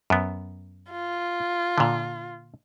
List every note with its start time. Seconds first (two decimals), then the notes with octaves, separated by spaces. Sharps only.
0.10 F#2 B3
0.91 F4
1.78 A#2 D3